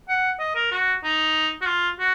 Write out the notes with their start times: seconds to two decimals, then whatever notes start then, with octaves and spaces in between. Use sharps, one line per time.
0.09 F#5
0.40 D#5
0.56 A#4
0.72 F#4
1.04 D#4
1.62 F#4
1.67 F4
1.99 F#4